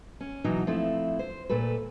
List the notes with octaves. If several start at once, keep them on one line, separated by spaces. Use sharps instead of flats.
C#4
B2 E3 F#3 D#4
F3 A3 C4 E4
C5
A#2 A3 A4 B4